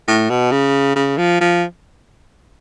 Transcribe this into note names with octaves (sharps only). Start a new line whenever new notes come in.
A2
B2
C#3
C#3
F3
F3